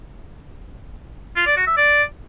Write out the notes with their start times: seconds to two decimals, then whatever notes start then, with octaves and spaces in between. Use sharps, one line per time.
1.37 F4
1.47 D5
1.57 F#4
1.67 E5
1.77 D5